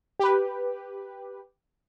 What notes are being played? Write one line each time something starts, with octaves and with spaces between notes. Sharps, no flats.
G4 B4